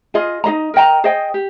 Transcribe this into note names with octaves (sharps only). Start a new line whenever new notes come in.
F4 G#4 D#5
D#4 G#4 D#5 A#5
A#4 D#5 G5 A#5
G#4 C5 D#5 G5
G4